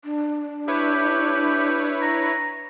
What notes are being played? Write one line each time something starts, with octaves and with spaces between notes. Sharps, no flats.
D4
E4 G4 B4 C#5
A#5